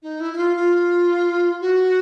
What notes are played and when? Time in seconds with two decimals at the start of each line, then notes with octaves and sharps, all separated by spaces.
0.03 D#4
0.20 E4
0.33 E4
0.38 F4
0.56 F4
1.61 F#4